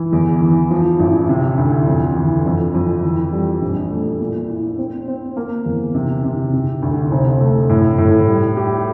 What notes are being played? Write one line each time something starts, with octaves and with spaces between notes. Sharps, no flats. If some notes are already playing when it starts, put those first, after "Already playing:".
Already playing: E3
E2
E3
F3
A1
C3
D2
F2
E3
F2
F2
E3
G3
A#1
A3
A#2
E4
C4
C4
A#3
E2
C3
C3
C3
D2
F1
A3
A2
A2
G3
G4